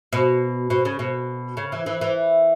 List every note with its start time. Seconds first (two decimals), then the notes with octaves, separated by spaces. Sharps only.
0.13 B2
0.70 B2
0.85 C#3
0.99 B2
1.57 C#3
1.72 E3
1.86 E3
2.01 E3